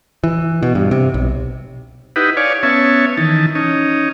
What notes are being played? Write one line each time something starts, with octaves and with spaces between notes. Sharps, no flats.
E3
B2
G2
C3
B1
D#4 E4 G4 B4 F#5
C#5 D5 F5 G#5
B3 C#4 C#5 E5 A5
D#3 E3 A5
C#4 D#4